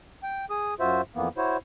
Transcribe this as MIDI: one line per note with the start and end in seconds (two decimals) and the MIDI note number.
0.23 0.45 79
0.50 0.74 68
0.50 0.74 87
0.80 1.01 42
0.80 1.01 65
0.80 1.01 66
0.80 1.01 72
0.80 1.01 76
1.15 1.28 41
1.15 1.28 52
1.15 1.28 58
1.15 1.28 59
1.37 1.57 64
1.37 1.57 66
1.37 1.57 72
1.37 1.57 73